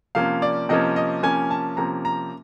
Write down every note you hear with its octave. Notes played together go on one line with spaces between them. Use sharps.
C3 F3 A#3 C#4 F5
D5
C3 F3 A#3 C#4 D#5
D#5
C3 F3 A#3 C#4 G#5
A5
C3 F3 A#3 C#4 A#5
A#5